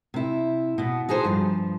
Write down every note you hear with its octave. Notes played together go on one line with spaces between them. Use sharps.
C3 E4
B2 B3
D#4 F#4 G#4 A4 C5
G2 F3